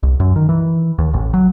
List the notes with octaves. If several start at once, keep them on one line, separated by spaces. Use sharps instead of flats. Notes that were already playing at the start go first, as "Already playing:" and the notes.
C2
F#2
D#3
E3
D#2
A1
F#3